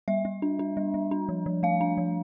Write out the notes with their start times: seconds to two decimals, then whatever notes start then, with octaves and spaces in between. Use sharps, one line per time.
0.08 G3 E5
0.25 G3
0.42 D4
0.59 D4
0.77 G3
0.94 G3
1.11 D4
1.29 F3
1.46 F3
1.63 A3 F5
1.81 D4
1.97 F3